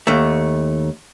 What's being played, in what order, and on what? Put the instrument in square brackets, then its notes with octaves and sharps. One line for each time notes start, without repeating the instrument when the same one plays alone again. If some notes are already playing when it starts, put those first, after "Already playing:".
[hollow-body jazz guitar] D#2 A3